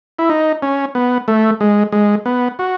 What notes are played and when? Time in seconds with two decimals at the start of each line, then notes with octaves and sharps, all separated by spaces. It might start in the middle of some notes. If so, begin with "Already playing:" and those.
0.19 E4
0.30 D#4
0.62 C#4
0.95 B3
1.28 A3
1.61 G#3
1.92 G#3
2.26 B3
2.59 F#4